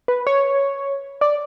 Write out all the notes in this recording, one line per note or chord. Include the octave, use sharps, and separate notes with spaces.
B4
C#5
D5